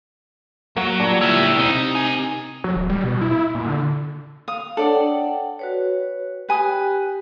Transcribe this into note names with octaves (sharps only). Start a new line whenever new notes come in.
F#3 A#3 F#4
A#2 G3 D4
E4 G4 C#5 E5
C3 D#4
A#4 G#5
F#3
D1
G3
B2
E4
A#2
D3
F5 D#6
D4 A4 C#5 D5 F#5
F#5 G5
F#4 B4 C#5
G4 B4 G5 G#5 D#6